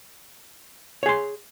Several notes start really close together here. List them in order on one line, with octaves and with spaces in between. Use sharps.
C#5 G#4 C6